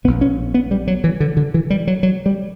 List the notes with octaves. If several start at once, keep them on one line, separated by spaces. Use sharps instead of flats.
A#1 A#2 B3
C#4
B3
G3
F#3
E3
D3
D3
E3
G3
F#3
F#3
G3